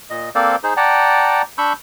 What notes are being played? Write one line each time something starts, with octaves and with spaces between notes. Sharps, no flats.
A#2 D#5
A#3 C4 A4 C5 D5 F5
D#4 G#4 C5
D5 F#5 G5 A5 A#5
D4 B5 C#6 E6 G6